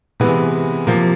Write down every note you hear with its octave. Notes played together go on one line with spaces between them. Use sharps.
C3 E3 G#3 B3
C3 F3 A#3